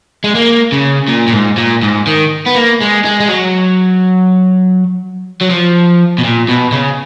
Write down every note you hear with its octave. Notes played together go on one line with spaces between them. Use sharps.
G#3
A#3
C#3
A#2
A#2
G#2
A#2
G#2
D#3
B3
A#3
G#3
G#3
G#3
F#3
F#3
F3
B2
A#2
B2
C#3